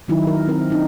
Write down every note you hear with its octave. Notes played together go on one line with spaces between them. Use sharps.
D#3 F#3 D#4 E4
A#4
C4 A#4
D4 D#4